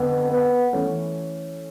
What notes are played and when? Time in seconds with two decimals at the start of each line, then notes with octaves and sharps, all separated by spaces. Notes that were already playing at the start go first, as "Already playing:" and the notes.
Already playing: F2 D3 B3
0.32 B3
0.73 E3 A3 C#4